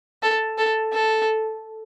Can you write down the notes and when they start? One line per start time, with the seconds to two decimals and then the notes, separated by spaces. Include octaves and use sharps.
0.23 A4
0.58 A4
0.92 A4